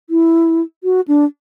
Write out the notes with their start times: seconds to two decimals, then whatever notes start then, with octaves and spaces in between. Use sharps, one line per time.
0.10 E4
0.84 F#4
1.08 D4